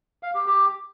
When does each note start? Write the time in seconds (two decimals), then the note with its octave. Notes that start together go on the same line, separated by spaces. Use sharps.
0.23 F5
0.35 G4
0.47 G4